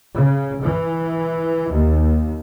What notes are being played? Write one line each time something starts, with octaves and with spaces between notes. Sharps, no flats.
C#3
E3
D#2